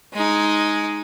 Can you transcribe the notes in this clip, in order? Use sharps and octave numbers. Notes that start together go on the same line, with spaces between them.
G#3 D#4